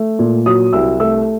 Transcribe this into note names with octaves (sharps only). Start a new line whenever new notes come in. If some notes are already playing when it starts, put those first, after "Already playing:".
Already playing: A3
A#2
F#3 D#6
C2 E6
A3 E6